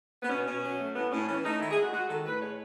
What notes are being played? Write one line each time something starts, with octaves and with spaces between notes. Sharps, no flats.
B3
B2 C#4
B2 C#4
F#3
A3
A2 B3
A2 C#4
E3 C#4
A3 D#4
D#3 E4
G#4
G#3
F#4
G#3 F#4
D#3 A4
A2 B4
G#3 C#5